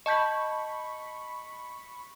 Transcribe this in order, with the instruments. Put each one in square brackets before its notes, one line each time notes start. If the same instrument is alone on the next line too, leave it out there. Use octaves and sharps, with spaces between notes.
[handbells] D#5 A5 G6 [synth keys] B5 C#6